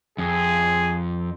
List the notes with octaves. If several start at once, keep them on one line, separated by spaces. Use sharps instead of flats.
F2 G#4